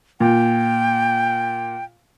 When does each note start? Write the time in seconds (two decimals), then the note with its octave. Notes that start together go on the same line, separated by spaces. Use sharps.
0.20 A#2 G5